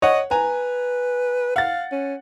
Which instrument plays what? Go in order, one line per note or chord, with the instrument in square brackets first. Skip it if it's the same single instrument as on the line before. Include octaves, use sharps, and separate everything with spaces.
[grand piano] C#5 F#5 [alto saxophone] D#5
[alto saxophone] B4 [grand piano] G#5 A#5
[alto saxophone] F5 [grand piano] F#5 A6
[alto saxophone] C#4